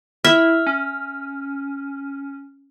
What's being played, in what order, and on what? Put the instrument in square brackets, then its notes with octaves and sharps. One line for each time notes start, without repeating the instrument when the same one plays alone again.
[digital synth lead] E4 [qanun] E5 [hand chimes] F6
[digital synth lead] C#4